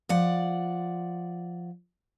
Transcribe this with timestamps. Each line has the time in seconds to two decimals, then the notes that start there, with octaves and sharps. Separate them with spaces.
0.09 F3 D5 F#5